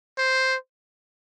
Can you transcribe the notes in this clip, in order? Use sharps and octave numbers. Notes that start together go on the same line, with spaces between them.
C5